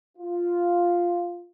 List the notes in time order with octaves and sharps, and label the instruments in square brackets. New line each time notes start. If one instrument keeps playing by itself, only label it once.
[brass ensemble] F4